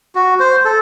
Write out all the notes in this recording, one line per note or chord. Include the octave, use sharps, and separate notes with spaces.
F#4
C5
A4